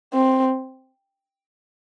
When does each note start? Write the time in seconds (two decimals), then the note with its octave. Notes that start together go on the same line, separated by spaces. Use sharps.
0.13 C4